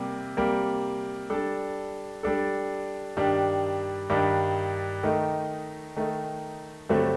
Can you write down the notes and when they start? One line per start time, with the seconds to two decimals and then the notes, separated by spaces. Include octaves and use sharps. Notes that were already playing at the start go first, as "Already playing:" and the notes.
Already playing: C3 G3 A#3
0.37 C3 G3 A#3
1.30 G3 D4 A4
2.23 G3 D4 A4
3.17 G2 D#3 G3 D4
4.10 G2 D#3 G3 D4
5.03 D#3 A3 D#4
5.96 D#3 A3 D#4
6.89 G2 D3 F#3 A3 C4